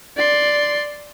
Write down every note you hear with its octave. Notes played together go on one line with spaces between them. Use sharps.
D5 C6